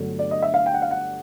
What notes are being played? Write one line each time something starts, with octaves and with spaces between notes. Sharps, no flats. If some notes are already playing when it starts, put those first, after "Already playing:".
Already playing: G1 G2 D3 F#3 A3
D5
D#5
E5
F5
G5
F#5
F5
F#5